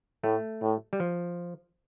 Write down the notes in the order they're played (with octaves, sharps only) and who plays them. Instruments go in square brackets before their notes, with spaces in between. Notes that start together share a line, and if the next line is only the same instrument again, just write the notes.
[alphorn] A2 [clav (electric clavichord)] A3
[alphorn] A2
[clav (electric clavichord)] G3
F3